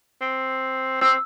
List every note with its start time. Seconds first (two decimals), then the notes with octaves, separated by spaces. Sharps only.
0.21 C4
1.01 C4 E6